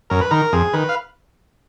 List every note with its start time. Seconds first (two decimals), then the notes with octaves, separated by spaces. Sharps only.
0.10 F#2 A#4
0.21 B4
0.31 D#3 A#4
0.53 F2 G#4
0.73 D#3 B4
0.89 F5